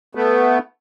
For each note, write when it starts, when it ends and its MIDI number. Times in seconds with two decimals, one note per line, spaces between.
0.15 0.58 57
0.15 0.58 59